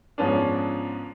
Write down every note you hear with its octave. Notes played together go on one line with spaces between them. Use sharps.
G#2 F3 B3 C#4 D4